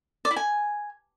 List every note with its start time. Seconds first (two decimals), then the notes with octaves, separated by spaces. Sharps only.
0.25 D5
0.31 E4
0.36 G#5